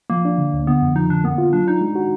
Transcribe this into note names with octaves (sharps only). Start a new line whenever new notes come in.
F3 A#3
D4
D3
D2
D3 B3
F2
F3 D#4
D3 D4
A#3 B3
F4
F#3 D4
D4 D#4
G#3
F#4